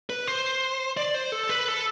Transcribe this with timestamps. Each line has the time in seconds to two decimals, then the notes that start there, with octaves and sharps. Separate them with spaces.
0.10 B4
0.27 C5
0.97 D5
1.14 C5
1.32 A4
1.49 B4
1.68 A4